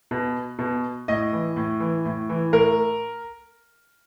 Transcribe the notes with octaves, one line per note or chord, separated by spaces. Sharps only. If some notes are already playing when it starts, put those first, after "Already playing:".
B2
B2
A2 D#5
E3
A2
E3
A2
E3
A2 A#4